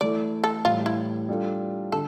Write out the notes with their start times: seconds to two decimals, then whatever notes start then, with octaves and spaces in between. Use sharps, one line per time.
0.01 E3 A3 E4 A4 D5
0.44 A4
0.65 A2 E3 G3 F4
0.86 E4
1.29 G3 D4 F4 A4
1.92 D3 A4